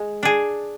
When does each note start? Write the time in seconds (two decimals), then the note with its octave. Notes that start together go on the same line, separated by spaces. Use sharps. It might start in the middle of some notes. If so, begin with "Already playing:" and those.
Already playing: G#3
0.23 D4 G#4